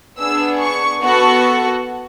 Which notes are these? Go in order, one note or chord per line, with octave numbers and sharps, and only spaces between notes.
B3 D4 G#4 E6
C#6
B3 F#4 A4 C#6